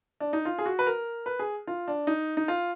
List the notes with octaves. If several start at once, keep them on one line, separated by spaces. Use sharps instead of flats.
D4
D#4
F4
G#4
F#4
B4
A#4
B4
G#4
F4
D4
D#4
D#4
F4